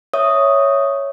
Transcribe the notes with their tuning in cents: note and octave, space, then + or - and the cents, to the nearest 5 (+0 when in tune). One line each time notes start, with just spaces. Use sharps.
C#5 +0 E5 +0 D#6 +0